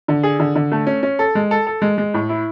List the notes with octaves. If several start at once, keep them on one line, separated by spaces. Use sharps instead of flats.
D3
G#4
D3
D3
A3
C#4
C#4
A4
G#3
A4
A4
G#3
G#3
A2
E4